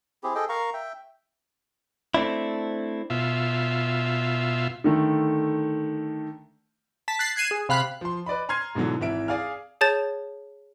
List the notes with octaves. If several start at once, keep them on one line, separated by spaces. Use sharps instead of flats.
C4 E4 G4 G#4
G#4 A4 D#5 G5
A#4 F5 A#5 C#6
E5 G5
A3 C4 D4 E4
B2 F4 E5
D3 D#3 A3
A5 B6
F#6 A6 B6 C7
F#6 G#6 C7 D#7 E7
G#4
C3 F5 B5 F#6
F3 C6
B4 D5 D#5 B5
A#5 C6 F6 G#6 C7 D#7
G#2 B2 D3 E3 F#3
G#1 E3 E5 D7
G#4 D5 F5 G#5 F6
G#4 C#5 A5 G6 A6